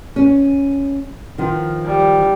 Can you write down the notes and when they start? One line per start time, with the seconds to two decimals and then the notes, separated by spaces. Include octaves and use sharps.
0.16 C#4
1.38 D#3 F3
1.85 G3